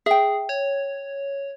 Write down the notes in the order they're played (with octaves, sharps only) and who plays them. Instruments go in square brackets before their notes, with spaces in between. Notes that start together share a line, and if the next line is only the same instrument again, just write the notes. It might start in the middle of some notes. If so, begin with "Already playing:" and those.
[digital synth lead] G#4 [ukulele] E5 G5
[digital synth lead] C#5